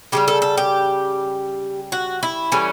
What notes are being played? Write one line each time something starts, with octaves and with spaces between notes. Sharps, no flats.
C#3 E3 G3 G4
A4
A4
G4
F#4
E4
A2 E3 G3 C#4